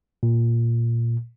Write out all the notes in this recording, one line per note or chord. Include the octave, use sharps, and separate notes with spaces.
A#2